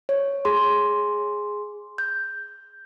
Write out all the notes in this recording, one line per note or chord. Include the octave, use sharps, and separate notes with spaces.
C#5
G#4 C6
G6